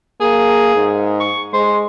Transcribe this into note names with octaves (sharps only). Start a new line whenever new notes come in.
A#3 G#4
G#2
C#6
G#3 C5